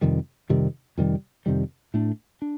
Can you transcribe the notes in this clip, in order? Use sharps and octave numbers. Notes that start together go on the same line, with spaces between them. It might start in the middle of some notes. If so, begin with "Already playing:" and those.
F2 C3 D#3 G3
F2 C3 D#3 G3
F2 C3 D#3 G3
F2 C3 D#3 G3
A2 A3 D4
D4